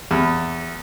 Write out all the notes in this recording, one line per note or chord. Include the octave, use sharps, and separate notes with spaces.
E2